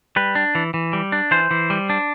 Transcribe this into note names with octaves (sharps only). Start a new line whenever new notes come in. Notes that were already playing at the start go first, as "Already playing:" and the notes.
G3 B4
D4
E3
E3
G3
D4
E3 C5
E3
G3
D4